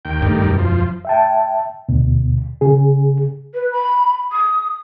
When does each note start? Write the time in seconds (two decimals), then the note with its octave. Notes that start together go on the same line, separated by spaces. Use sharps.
0.05 D#2 G5
0.22 G2 D#3 G3 A3
0.42 E1 F#2
0.59 F3
1.05 E5 G5 A5
1.89 D2 B2
2.61 C#3 G#4
3.54 B4
3.72 B5
4.32 D#6